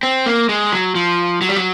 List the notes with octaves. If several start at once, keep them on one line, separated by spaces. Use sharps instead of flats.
C4
A#3
G#3
F#3
F3
F#3
G3
F#3